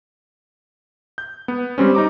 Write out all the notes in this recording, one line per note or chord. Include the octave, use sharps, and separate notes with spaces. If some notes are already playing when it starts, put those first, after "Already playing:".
G6
B3
G3 C4 C#4
D#4 A#5 D6